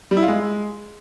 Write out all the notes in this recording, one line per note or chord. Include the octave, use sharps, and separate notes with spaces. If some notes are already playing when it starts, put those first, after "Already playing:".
G3
E4
F4
G#3